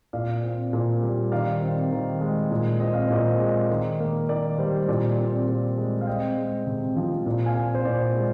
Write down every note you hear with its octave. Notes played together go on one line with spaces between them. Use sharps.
A#2 D5 F5
C4
A#2
G3
D#3 D5 F5
C4
D#3
G#3
A#2
C4 D#5
F5
A#2 C5 D#5
G#3
D#3
A#3
D#3 D5
G3 C5
A#2 D5
C4
A#2
G#3
F5
C4 D#5 G5
G#3
C3
F3
A#2
F5 G#5
C4
C5
A#2 D5
G#3